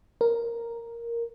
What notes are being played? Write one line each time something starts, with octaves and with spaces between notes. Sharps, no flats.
A#4